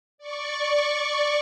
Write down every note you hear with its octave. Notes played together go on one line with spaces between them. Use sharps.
D5 C#6